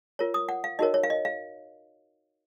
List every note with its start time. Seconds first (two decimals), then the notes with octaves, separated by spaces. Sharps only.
0.19 F4 A#4 C#5
0.34 D#6
0.49 F#5
0.64 F5
0.79 D#4 F#4 A#4 C#5 D#5
0.94 C#5
1.03 F5
1.10 D#5
1.25 F5